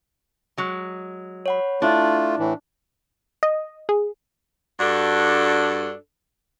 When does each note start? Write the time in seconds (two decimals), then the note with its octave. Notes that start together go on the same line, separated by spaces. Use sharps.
0.58 F#3 G#3
1.46 C#5 F#5 B5
1.82 A3 D4 E4 F4 E5
2.39 A2 E3
3.43 D#5
3.89 G#4
4.80 G2 D4 F#4 A4